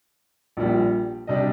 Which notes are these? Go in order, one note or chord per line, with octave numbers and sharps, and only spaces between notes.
A#1 A#2 G3
C3 G3 D4 D#5